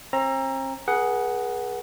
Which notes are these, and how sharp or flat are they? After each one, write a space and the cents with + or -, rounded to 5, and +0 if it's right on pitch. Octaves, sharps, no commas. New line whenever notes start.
C4 +40 A#5 +0
G#4 +0 B4 -45 F#5 +10